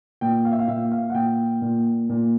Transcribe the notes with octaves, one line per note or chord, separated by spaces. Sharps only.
A#2 G5
F5
E5
F5
A#2 E5
F5
F#5
A#2 G5
A#2
A#2